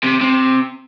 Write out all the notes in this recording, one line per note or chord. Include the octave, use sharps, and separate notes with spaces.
C3
C3